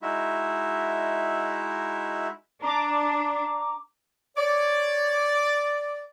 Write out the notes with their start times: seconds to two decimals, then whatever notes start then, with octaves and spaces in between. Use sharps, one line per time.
0.02 G#3 D#4 E4 F#4 E5
2.62 D4 A#5 D6
4.37 C#5 D5